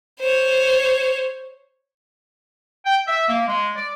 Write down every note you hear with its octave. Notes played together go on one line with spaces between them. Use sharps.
C5 C#5
G5
E5
A#3
G#3
D5